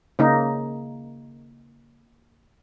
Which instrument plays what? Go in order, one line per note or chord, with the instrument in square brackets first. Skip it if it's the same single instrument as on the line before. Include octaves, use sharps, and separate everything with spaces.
[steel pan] C#3 A#3 D#4